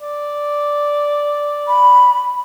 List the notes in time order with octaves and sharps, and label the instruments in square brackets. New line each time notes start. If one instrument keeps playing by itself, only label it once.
[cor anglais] D5
[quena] B5